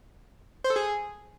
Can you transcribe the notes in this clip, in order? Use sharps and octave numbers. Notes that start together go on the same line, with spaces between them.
C5
A4
G#4